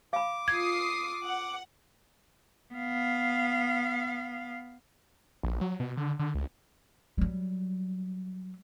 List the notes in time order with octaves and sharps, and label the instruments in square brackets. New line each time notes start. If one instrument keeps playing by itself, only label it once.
[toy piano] F5 B5 [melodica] D6
[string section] F4 D#6 C7 [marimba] G#6
[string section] F#5
[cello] B3 F5
[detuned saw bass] A#1
F#3
B2
D3
D3
C#2
[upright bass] F#3 G3